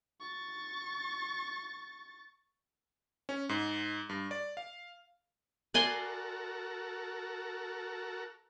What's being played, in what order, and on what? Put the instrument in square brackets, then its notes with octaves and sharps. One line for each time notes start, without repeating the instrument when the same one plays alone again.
[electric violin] C#6 A6
[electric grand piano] C#4
G#2
G2
D5
F5
[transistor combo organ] F#4 A4 A#4 [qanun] D5 G#5 C6